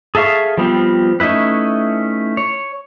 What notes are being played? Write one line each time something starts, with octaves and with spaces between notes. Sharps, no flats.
G#4 A4 E5 F5 C#6
F3 G3 B3 C4 F4
A3 C#4 D#4 E4 B4
C#5